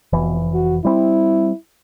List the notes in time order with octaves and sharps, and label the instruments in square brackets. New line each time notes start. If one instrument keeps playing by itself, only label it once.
[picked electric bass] F1 E3 [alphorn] B2
[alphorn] F#4
[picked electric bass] G3 C4 [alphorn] E4